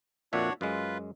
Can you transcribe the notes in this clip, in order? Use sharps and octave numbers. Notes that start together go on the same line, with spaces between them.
F2 A#2 D4 F#4 C#5 E5
F#2 G#3 F4 B4